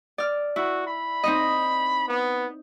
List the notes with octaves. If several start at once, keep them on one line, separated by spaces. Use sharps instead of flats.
D5 F6
E4 F#4
B5
C4 D#4 D#5
B3